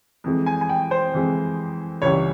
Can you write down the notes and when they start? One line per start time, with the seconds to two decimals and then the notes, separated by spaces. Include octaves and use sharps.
0.24 F2 E3 G#3
0.46 G#5
0.61 G#5
0.69 G5
0.91 C5
1.14 F2 E3 G#3
2.02 C#2 C#3 E3 G3 C#5